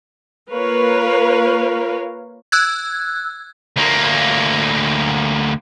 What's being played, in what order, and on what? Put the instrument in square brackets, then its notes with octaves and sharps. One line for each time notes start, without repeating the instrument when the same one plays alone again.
[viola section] A#3 F4 A#4 B4 C#5 F5
[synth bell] E6 F#6 G#6
[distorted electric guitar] D2 A#3